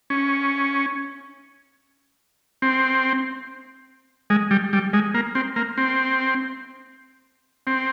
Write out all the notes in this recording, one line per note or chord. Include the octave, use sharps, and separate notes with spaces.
C#4
C4
G#3
G3
G3
G#3
A#3
C4
A#3
C4
C4